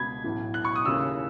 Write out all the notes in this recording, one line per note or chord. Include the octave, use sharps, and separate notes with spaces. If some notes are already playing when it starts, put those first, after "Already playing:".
Already playing: C#2 B2 B5 G#6
B1 A2 E3
F#6
C#6
D#6
D#2 C#3 E3 E6